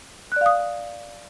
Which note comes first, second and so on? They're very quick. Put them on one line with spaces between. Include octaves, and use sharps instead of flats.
F#6 D5 F5 D#6